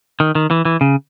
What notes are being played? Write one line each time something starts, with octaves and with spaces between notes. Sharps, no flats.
D#3
D#3
E3
E3
C#3